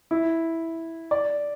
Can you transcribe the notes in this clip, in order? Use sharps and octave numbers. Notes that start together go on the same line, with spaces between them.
E4
D5